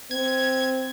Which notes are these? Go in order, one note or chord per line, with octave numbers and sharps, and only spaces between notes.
C4 G#6